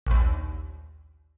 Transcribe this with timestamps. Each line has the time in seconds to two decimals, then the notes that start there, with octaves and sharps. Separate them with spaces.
0.06 A#1 D#2